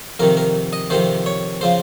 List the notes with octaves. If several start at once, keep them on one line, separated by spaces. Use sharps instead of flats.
F2 C3 D#3 A#4
A#4
D#5
F2 C3 D#3 C5
C#5
C#3 F3 C5